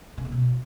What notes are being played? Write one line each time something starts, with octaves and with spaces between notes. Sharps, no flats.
C#3
A#3
B2